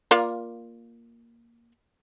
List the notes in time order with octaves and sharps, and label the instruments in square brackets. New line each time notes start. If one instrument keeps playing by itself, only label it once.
[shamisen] A#3 F4 D5